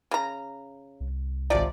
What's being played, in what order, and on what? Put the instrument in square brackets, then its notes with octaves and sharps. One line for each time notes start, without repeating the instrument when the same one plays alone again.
[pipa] C#3 A#5
[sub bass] C2
[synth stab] G#1 D5 [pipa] C3 F3